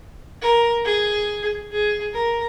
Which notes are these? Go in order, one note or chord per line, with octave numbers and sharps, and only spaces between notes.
A#4
G#4
G#4
A#4